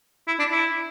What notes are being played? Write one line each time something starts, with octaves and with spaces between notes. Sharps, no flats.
E4
D4
E4